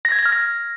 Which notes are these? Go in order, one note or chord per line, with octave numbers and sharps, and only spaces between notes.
A#6
G#6
A#6
F6
A#6